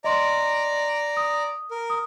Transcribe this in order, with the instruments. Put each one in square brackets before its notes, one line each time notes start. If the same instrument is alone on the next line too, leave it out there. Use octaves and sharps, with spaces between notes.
[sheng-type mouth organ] D5 A#5 [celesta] D#5 C6
[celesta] D#6
[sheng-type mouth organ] A#4
[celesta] D#6